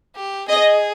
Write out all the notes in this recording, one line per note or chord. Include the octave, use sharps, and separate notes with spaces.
G4
G#4 D#5